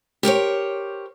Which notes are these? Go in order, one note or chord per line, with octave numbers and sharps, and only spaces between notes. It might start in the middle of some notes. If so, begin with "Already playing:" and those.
G4 A#4 C5 C#5